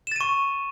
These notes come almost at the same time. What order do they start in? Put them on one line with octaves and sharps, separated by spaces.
E7 A6 D#7 C#6